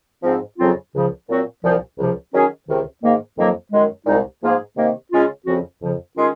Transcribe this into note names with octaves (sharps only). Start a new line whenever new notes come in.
G#2 F3 C4
F2 C#3 F#3 C4 F4
C#2 C#3 F3
A#2 F#3 C4 F#4
C2 A#2 F3
C#2 C3 F3
D#3 F#3 C#4 G#4
C#2 C3 D#3
G#2 D#3 A#3
F2 D#3 F#3 A#3
F#2 D#3 G#3
C2 A#2 G#3 D#4
G#2 F3 A#3 F4 G#4
C3 D#3 A#3
C#3 G#3 C#4 F4
F2 C#3 F3 C4 F#4
F2 C#3 F3
D#3 G#3 C#4 F4 G#4